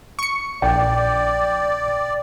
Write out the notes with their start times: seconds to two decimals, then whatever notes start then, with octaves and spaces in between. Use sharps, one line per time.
0.19 C#6 C#7
0.62 A#1 D5 G5